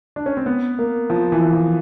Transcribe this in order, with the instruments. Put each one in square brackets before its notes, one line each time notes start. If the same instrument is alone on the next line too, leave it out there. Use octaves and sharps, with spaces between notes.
[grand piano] D4
C#4
C4
B3
A#3
F3
E3
F3